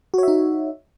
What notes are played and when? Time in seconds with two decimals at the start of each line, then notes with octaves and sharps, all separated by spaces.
0.14 F#4
0.18 C#5
0.23 E5
0.28 D#4